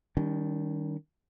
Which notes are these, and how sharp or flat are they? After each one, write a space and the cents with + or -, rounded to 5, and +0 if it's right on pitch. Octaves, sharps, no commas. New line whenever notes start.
D#3 +0 G3 +0 C#4 +40